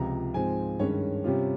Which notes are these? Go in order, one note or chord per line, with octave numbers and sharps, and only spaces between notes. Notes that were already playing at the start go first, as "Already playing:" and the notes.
Already playing: C#2 C3 F3 A#5
G#2 F3 G#3 C4 G#5
G2 D#3 G#3 C#4 C#5
C3 G3 C#4 F4